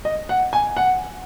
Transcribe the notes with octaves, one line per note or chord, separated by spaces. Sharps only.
D#5
F#5
G#5
F#5